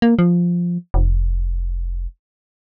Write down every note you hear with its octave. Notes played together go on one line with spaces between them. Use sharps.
A#3
F3
F1